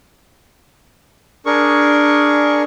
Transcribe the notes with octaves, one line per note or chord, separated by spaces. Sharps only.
D4 G#4 A#4 C#6